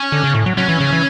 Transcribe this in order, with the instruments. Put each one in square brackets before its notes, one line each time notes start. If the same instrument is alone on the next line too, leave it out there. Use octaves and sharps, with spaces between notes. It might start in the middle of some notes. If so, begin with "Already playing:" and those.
Already playing: [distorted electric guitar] C#4
[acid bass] D3
C#3
A2
F#3
[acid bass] F#3 [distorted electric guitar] C#4
[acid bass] E3
C#3
E3